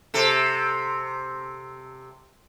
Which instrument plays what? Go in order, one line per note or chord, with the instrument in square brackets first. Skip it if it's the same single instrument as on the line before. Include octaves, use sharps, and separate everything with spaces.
[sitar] C3 A4